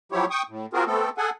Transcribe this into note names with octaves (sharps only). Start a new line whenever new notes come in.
F3 F#3 E4 G4 C#5
G5 C#6 D#6
A2
C4 F4 F#4 G#4 A#4
A3 B3 C4 A4
G#4 A4 F#5 G#5